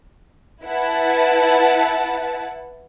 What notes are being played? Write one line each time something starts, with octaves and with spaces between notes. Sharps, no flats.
E4 B4 F#5 A5